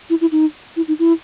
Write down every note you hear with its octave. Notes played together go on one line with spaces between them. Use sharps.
E4
E4
D#4
E4
D#4
E4